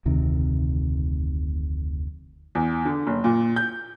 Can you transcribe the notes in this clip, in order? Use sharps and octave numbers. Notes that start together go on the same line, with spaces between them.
F1 D2 C3 D#3
E2
D3
F#1
A#2
G6